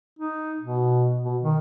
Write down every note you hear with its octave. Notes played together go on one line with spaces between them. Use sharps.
D#4
B2
B2
D#3